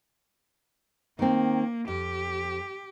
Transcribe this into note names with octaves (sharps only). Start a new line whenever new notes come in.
D#3 A#3 C4
F2 G4